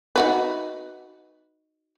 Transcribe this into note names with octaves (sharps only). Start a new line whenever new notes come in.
D#4 F#4 B4